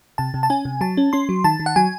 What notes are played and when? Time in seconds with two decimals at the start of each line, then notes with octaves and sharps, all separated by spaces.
0.18 C3 A5
0.34 C3
0.43 A5
0.50 C#4 G#5
0.65 C3
0.81 F#3 A5
0.97 C#4
1.13 C#4 C6
1.29 F#3
1.44 D#3 A5
1.60 D#3
1.66 F#5
1.76 F#3 G#5